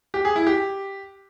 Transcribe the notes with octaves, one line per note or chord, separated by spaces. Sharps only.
G4
G#4
E4
G4